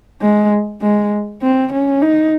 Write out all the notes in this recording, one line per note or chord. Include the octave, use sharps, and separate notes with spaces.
G#3
G#3
C4
C#4
D#4